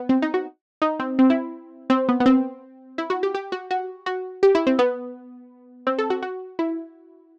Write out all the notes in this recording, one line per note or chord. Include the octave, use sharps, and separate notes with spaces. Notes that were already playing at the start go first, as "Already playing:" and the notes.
Already playing: B3
C4
D#4
F#4
D#4
C4
C4
E4
C4
B3
B3
C4
E4
F#4
G4
G4
F#4
F#4
F#4
G4
E4
C4
B3
C4
A4
F#4
F#4
E4